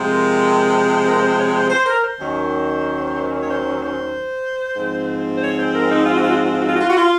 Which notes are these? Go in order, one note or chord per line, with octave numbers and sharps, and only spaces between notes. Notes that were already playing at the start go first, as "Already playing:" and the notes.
Already playing: C3 F3 G#3
A#4
C5
A#4
C5
C#5
C5
C5
A#4
C5
D#2 D#3 F#3 C#4
C#5
C5
C5
G#2 F3 C4
C5
C#5
C5
A#4
D#4
F4
F#4
F4
F#4
F4
F#4
F4
F#4
F4
F#4
F4
F#4
F4